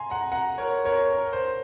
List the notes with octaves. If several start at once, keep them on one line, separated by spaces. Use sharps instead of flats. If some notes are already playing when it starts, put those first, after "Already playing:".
Already playing: G#5 A#5 C6
F#5 A#5
F#5 A#5
A#4 C#5
A#4 C#5
A#4
C5